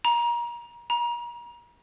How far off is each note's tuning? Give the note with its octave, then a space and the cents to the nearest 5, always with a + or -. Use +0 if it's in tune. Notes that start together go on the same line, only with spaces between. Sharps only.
A#5 +30
A#5 +40